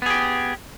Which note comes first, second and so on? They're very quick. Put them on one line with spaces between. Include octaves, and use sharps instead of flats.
B3 G#4 G4